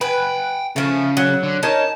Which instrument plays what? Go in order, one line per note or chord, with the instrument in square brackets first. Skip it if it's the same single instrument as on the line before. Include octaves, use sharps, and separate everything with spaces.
[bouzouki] B4 [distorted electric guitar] G5 G#5
[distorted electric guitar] C#3 [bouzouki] F3 A3
[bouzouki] F#3
[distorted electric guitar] D3
[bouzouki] C#4 D#4 A#4 [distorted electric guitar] A5